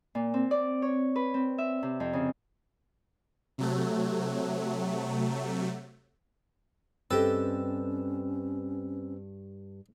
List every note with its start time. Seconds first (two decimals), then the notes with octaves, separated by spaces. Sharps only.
0.15 A#2
0.34 C4
0.51 D5
0.82 C#5
1.16 B4
1.34 C4
1.58 E5
1.83 C3
2.00 F2
2.13 C#3
3.58 C3 F#3 A3
7.11 G2 C4 C#4 G4 A4 B4 D#5 E6